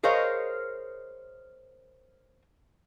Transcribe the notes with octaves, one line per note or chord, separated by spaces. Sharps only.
G#4 A#4 C5 C#5 D#5 F5